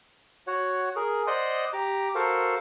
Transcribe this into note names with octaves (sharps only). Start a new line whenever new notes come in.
F#4 C#5 F#5
G#4 A#4
C5 D5 D#5 F#5 C6 D#6
G4 A#5 D6
F#4 A4 A#4 C5 F5